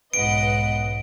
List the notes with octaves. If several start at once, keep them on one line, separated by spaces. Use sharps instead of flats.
B1 G#2 B3 B4 D#5 F#5 D7